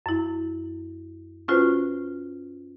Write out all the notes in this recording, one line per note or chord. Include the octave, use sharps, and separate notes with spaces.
F#2 E4
C#4 F4 F#4 B4 C5